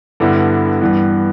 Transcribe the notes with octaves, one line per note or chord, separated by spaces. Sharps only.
G2 D3 G3 B3 E4
G2 E3 B3